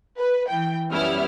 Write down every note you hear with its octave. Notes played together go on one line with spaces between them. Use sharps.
B4
E3 G5
F#2 G3 B3 C#4 E4 F6